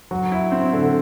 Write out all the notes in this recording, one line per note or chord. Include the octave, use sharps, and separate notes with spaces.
F#3
E4
C4
D3